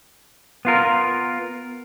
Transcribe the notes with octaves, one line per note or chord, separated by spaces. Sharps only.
B3 F4 A#4